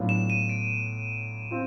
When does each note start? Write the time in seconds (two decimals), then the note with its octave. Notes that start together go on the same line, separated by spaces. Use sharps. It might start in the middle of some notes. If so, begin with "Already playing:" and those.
Already playing: A2 F#3 B3 D4 F4
0.09 E7
0.30 D#7
0.49 D7
1.51 C4 F4